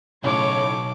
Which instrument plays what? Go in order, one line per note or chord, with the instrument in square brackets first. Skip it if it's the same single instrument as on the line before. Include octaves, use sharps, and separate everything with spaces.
[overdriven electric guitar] B1 [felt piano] A2 C#3 [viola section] C#5 [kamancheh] A5 D6